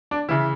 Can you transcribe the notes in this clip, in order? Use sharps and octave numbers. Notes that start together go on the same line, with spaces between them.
D4
C#3 E3 E4